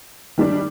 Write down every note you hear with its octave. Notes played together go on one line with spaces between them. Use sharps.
D#3 G3 D4